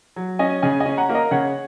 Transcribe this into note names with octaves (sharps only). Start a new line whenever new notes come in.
F#3
C#4 D#5 G#5
C#3 D#5 G#5
D#5 G#5
C#4
F#5 A#5
A#3
A#4 D#5
C#3 C#5 F#5